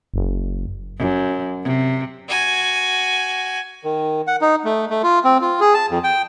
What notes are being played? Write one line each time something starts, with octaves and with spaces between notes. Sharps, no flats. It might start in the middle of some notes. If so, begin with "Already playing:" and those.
F#1
F#2
C3
F#4 G#5
D#3
F#5
D#4
A3
A3
F4
C4
F4
G#4
A5
F2
G5